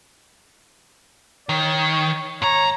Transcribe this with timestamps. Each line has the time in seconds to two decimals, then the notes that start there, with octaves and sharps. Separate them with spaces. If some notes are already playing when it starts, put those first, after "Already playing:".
1.49 D#3 C#5
2.42 G#2 C#5 A#5